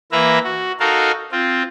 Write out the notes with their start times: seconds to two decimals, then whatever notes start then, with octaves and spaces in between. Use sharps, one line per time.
0.12 E3 A#3 B4 E5 A#5
0.44 F#4
0.80 D#4 F#4 A4 A#4 F5
1.32 C4 F4